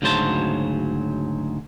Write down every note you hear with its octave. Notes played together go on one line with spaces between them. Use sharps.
D2 G#2 C#3 F#3 C5 A5